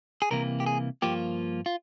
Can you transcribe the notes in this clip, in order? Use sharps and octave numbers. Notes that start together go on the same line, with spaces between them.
G#4
C2 C3 E3 A#3 A#4
G4
G#4
G2 F3 A#3 F4 G4
F4